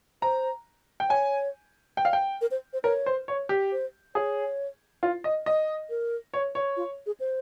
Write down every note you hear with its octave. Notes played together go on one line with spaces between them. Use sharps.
C5 A#5
G5
C#5 G#5
G5
F5
G5
A#4
C5
C5
A#4 C#5
C5
C#5
G4
C5
G#4 C#5
F4
D#5
D#5
A#4
C#5
C#5
F4
G#4
C5